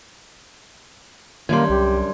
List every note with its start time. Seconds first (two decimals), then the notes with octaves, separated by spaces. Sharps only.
1.49 F#2 D3 D#3 G3 A#3 C6 G#6
1.69 C2 G4